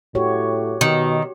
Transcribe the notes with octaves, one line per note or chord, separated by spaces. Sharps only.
A2 F#4 G4 C#5
B2 D#3